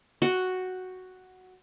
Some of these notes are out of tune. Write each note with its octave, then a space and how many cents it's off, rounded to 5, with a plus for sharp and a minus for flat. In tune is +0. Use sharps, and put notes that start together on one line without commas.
F#4 +0 G5 +0